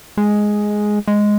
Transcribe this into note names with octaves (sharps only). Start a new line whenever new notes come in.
G#3
G#3